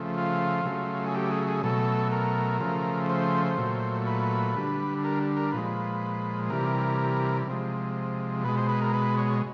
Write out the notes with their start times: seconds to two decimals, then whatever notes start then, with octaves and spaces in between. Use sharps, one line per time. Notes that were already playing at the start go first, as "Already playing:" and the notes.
Already playing: C#3 F3 A3
0.17 F4
0.65 C#3 F#3 A3
1.06 G#4
1.15 G4
1.31 G#4
1.47 G#4
1.63 B2 F#3 A3 A4
2.12 A#4
2.60 C#3 F3 A3
3.09 C5
3.58 A#2 F#3 A3
4.07 B4
4.56 D3 G3
5.04 A#4
5.37 A#4
5.52 A#2 F3 G#3 B4
6.50 C3 E3 G3 A#4
7.47 C3 F3 G#3
8.44 B2 G#3 B4
8.57 C5
8.69 B4
8.81 A#4
8.93 B4
9.18 C#5